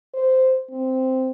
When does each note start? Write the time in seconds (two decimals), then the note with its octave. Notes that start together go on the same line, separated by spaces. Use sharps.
0.14 C5
0.70 C4